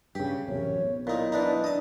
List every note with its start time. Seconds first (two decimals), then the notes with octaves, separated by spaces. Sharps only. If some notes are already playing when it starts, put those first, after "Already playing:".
0.15 G2 C#3 G4
0.48 A1 F#2 C3 C#5
0.80 B1
1.07 A#2 D#4 E4
1.32 E3 D4 D#4 D5
1.64 D4 D#5 A5